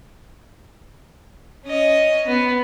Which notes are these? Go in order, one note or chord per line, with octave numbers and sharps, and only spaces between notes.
C#4 D#5
B3